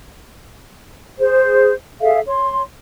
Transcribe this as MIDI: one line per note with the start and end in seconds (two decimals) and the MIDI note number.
1.19 1.72 68
1.19 1.72 72
2.01 2.19 68
2.01 2.19 69
2.01 2.19 76
2.01 2.19 77
2.26 2.62 73
2.26 2.62 84